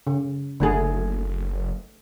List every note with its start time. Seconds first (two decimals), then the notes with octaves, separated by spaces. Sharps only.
0.07 C#3
0.60 F#1 D3 A3 G#4